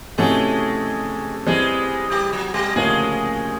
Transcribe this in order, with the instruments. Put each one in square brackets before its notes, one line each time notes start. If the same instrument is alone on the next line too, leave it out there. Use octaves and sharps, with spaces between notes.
[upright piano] C3 E3 A3 C#4 F#4 [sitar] G#3 G#4
[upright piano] E3 G3 C4 [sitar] G#3 G#4
[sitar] G3 G4
F#3 F#4
G3 G4
[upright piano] D2 C#3 F3 A#3 C#4 [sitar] G#3 G#4